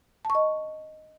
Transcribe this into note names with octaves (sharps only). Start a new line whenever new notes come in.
A5
C#6
D#5